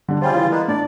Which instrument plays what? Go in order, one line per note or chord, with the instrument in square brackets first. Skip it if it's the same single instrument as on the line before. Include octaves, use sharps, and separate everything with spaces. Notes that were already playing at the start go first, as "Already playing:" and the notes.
[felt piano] D3 G3 D4
[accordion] C#3 G3 F4 [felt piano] C5 G5 G#5
[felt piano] E3
[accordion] G#3 A#3 B3
[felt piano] A2 D4 [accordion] D5